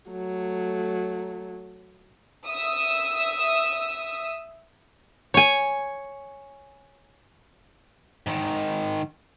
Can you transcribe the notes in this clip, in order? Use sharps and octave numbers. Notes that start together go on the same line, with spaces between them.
F#3 A3
E5 D#6 E6
C#5 G#5
G#2 D#3